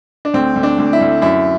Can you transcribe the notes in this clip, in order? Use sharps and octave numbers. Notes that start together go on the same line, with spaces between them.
D4
D2 C4
D2
D4
D2
E4
D2
F#2 E4